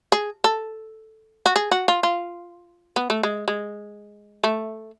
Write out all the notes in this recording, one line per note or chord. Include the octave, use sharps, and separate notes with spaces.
G#4
A4
F#4
G#4
F#4
F4
F4
B3
A3
G#3
G#3
A3